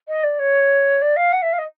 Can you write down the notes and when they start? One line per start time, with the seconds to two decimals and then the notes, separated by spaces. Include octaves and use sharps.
0.08 D#5
0.23 D5
0.39 C#5
1.01 D5
1.16 F5
1.32 F#5
1.42 E5
1.53 F5
1.58 D#5